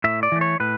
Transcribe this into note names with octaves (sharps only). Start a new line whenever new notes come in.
A2 E5
D5
E3 A3
C#5
A2 B4